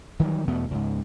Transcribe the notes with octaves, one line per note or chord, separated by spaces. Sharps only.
D#3 E3 F#3 G3
E2 B2 A3 B3
C#2 G#2